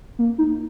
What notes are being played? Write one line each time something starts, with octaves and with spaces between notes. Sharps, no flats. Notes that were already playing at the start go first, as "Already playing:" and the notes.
A#3
D#4